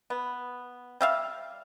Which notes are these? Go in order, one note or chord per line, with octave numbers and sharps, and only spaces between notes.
B3
G3 E5 F5